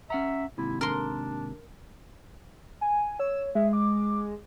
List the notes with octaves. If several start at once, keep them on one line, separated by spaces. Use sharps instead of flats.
C#4 E5 F#5 A#5
D#2 G#2 C3 E4
D4 A#4 C6
G#5
C#5 E6
G#3 E5
D6